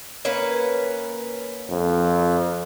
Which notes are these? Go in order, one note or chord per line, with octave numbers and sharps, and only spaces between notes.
A#3 C#4 B4
F2